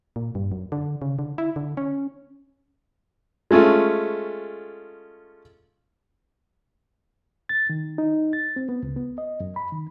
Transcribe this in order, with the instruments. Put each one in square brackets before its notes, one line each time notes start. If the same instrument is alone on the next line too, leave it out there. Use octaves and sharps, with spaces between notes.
[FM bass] A#2
G2
F#2
D3
C#3
D3
E4
D3
C#4
[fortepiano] G#3 A3 C#4 F4
[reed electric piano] A6
D#3
D#4
A6
C4
B3
C#2
B3
D#5
F#2
B5
D#3